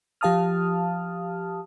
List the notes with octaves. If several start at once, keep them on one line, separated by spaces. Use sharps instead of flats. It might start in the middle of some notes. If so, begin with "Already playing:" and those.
F3 G4 F5 A5 D#6 F6